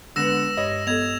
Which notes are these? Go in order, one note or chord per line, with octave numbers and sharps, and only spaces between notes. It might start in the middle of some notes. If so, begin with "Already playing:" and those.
D3 G#3 B3 B4 E6 A#6 E7
G2 C#5 D#5
B3 A4 D#5 G#6 F7